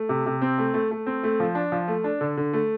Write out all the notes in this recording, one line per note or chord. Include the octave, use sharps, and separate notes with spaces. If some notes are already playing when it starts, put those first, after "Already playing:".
Already playing: A3
C3
C3
C4
A3
A3
A3
C4
A3
F3
D4
F3
A3
D4
D3
D3
A3